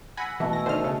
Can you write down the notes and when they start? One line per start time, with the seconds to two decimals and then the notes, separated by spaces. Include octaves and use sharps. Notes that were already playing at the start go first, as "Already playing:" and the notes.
0.17 F#5 G#5 B5 E6 A#6
0.40 B2 E3 A3
0.53 E5 G#5 E6 A#6
0.66 D3 D#3 C5 A5 A#5 F6
0.84 C#3